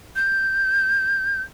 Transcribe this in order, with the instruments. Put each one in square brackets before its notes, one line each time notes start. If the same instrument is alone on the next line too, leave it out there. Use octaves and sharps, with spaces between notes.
[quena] G6